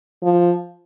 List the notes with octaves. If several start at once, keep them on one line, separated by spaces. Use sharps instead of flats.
F3